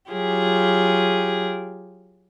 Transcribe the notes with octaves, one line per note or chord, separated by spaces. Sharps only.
F#3 F4 G4 G#4